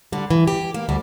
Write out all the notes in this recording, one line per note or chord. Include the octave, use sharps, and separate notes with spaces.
D3 G3
E3
G4
A#3
D2 G3